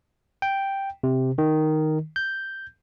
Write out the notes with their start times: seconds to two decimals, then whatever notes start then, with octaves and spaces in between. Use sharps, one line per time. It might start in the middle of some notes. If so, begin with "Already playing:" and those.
0.42 G5
1.03 C3
1.38 D#3
2.16 G6